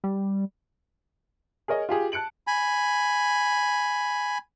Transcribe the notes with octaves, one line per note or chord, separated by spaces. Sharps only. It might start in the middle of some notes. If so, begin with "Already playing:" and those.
G3
G#4 A#4 C#5 D#5
F4 G4 G#4
A5 F#6 C#7 D7 F#7
G#5 B5